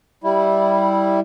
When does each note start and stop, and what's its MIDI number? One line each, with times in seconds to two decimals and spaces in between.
0.24 1.20 55
0.24 1.20 64